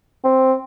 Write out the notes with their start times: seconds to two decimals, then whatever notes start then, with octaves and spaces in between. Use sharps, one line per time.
0.24 C4